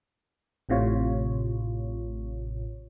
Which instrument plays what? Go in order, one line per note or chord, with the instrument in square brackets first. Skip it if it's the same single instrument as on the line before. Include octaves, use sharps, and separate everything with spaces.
[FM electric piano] A1 A2 C3 F4 C#5